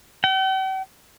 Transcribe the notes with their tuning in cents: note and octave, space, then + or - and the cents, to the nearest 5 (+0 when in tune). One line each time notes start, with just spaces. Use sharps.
G5 -45